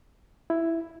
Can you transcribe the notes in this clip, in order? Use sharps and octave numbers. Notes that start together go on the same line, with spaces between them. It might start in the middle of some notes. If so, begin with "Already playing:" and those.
E4